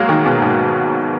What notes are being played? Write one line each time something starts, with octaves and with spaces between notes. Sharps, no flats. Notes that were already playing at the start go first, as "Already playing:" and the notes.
Already playing: F#3 G#3 A#3
D#3
B2
G#2